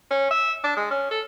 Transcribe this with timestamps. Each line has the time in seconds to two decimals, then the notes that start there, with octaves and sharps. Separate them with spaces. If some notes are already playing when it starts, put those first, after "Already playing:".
0.11 C#4
0.31 E5
0.64 D4
0.76 G#3
0.90 C#4
1.11 A4